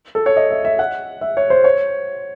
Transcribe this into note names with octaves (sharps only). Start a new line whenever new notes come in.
A4
C#5
D#5
E5
E5
F#5
E5
C#5
C5
C#5